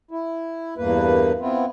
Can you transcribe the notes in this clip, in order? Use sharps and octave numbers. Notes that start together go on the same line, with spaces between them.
E4
E2 G2 A#3 B4
B3 C4 E4 F4